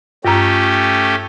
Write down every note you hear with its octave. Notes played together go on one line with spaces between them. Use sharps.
G2 A3 C#4 G4 A#5